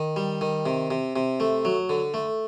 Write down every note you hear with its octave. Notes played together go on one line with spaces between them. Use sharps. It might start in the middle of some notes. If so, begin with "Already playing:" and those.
Already playing: D#3
G3
D#3
C3
C3
C3
A3
F#3
D3
A3